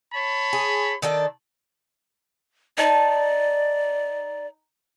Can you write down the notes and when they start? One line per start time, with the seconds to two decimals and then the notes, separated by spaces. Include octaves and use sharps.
0.13 C#5 A5 B5
0.53 G#4
1.02 D#3 D4 A4
2.78 D#4 D5 A5